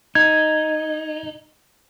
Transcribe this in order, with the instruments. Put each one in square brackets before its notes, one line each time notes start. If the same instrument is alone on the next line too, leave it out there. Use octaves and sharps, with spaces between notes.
[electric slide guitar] D#4 [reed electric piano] G#6